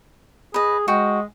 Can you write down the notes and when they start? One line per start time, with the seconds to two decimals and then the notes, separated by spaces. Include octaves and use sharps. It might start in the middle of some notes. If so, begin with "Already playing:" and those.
0.54 G#4 B4 D#5
0.88 G#3 F#4 G5